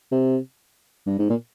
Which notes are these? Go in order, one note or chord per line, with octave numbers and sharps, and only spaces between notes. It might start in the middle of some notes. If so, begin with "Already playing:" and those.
C3
G2
G#2
A#2